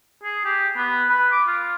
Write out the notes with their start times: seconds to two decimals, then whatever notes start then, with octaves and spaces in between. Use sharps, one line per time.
0.24 G#4
0.45 G4
0.77 B3
1.09 B4
1.32 D6
1.47 F4